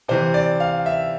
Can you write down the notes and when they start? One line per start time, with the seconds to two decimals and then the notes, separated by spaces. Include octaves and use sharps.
0.08 C3 E3 C5
0.34 D5
0.60 F5
0.86 E5